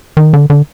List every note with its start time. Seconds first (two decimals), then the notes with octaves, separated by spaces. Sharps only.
0.17 D#3
0.33 D3
0.50 D3